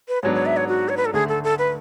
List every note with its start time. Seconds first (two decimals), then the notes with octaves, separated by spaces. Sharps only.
0.08 B4
0.23 G#2 F#3 B3 D4 C#5
0.34 C#5
0.46 E5
0.57 C#5
0.68 F#4
0.89 C#5
0.97 B4
1.05 A4
1.13 D2 D3 A3 G#4
1.29 A4
1.44 A4
1.58 B4